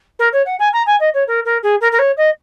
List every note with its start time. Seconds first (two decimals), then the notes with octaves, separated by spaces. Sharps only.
0.19 A#4
0.33 C#5
0.46 F#5
0.59 G#5
0.73 A#5
0.86 G#5
1.00 D#5
1.14 C#5
1.27 A#4
1.45 A#4
1.63 G#4
1.81 A#4
1.92 A#4
1.99 C#5
2.17 D#5